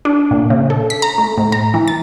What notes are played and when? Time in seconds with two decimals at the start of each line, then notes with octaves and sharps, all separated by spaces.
0.05 D4
0.31 A#2
0.50 C#3
0.70 A4
0.90 B6
1.02 A#5
1.18 A3
1.38 A2
1.52 A#5
1.74 E3
1.88 A6